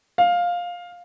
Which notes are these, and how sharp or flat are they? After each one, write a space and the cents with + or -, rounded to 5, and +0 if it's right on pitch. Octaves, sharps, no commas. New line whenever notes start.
F5 +10